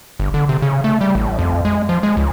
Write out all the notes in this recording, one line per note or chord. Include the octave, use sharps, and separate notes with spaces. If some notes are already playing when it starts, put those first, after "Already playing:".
G1
D3
C3
C#3
A3
G3
A1
F2
G#3
F3
G#3
C#2